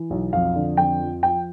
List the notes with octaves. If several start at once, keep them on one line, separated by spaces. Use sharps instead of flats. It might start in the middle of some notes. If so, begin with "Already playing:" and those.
Already playing: E3
B1
F2 F5
D3
F2 G5
F3
F3 G5